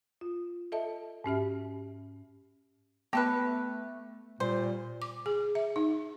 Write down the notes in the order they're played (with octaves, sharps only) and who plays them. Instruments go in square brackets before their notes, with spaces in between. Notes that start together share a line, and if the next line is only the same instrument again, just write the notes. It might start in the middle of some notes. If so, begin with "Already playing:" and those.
[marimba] F4
A4 D#5 E5 A5
G#2 C#4 G4 E5
[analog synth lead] A3 [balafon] B3 [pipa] G4 A4 B4
[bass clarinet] A#2 [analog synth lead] G3 [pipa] C5
[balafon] D6
G#4
E5
D#4